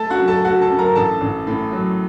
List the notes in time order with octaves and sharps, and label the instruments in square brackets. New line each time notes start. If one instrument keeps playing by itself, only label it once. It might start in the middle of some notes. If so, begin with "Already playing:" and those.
Already playing: [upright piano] A3 A4 A5
F#4 F#5
F#2
A4 A5
A3 F#4 F#5
A4 A5
F#2
A#4 A#5
A1 A4 A5
A1
A2
F#3